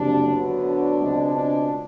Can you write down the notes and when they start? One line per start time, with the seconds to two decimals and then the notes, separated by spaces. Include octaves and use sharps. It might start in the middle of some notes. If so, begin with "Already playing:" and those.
Already playing: F#1 F2 C3 D4
0.28 D2 D3 F#3 B3
0.65 D4
1.00 C#2 B2 G#3 C4
1.35 D4